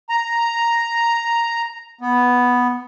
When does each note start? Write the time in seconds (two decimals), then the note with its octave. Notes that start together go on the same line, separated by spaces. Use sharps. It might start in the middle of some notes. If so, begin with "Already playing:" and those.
0.09 A#5
2.01 B3